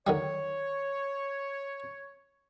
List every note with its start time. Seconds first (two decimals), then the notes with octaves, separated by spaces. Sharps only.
0.07 D3 D#3 G3 C#5